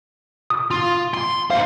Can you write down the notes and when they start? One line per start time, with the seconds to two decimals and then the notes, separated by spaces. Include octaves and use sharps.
0.50 D#6
0.71 F4
1.14 C6
1.50 C5 F5 F#5